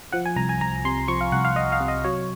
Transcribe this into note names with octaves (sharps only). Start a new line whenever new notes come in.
F3 F#5
G#5
C2 A#5
G#5
C2 A#5
C3 C6
F3 C#6
F5
C2 F#5
F5
C2 D#5
F5
C3
D#5
F#3 C#5